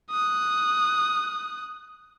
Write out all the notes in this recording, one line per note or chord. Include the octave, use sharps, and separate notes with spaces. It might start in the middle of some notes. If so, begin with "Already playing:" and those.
D#6 F#6